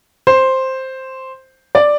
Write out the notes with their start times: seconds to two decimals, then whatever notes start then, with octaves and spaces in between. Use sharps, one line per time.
0.27 C5
1.75 D5